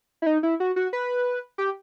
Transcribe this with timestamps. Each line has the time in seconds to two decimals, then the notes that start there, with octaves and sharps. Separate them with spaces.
0.22 E4
0.26 D#4
0.43 E4
0.60 F#4
0.76 F#4
0.93 B4
1.58 G4